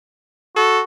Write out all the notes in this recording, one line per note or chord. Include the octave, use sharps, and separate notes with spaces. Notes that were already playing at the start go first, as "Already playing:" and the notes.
F#4 A4